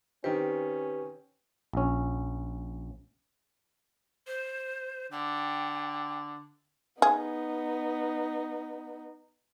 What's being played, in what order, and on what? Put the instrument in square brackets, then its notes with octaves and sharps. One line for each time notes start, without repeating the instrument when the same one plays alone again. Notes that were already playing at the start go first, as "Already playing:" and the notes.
[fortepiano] D#3 C4 [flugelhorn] C#4 [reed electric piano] G4 [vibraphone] B4
[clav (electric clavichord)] A#1 C#4
[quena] C5
[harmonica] D3 [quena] G5
[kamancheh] B3 D#4 [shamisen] G#4